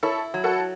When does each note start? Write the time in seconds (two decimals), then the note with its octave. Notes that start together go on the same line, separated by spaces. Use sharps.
0.03 E4 A4 C#5
0.34 F#3
0.44 F#4 A4